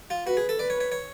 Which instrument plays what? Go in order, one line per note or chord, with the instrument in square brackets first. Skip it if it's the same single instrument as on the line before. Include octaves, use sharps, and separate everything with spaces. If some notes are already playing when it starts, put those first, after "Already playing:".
[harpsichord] F4
[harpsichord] F#4 [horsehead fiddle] B4
[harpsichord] G#4
A4
[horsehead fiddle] B4 [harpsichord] D5
[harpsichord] C#5
C#5
C#5